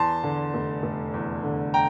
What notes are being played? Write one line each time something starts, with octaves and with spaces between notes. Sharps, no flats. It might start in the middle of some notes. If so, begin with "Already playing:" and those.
Already playing: E2 A5 C6
D3
F1
F1
E2
D3
G5 A#5